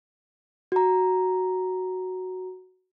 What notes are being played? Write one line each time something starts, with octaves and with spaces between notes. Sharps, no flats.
F#4 A#5